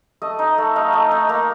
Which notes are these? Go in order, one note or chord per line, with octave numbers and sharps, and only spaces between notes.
A3 D#5
D#4
A3
D#4 F5
A3
D#4
A#3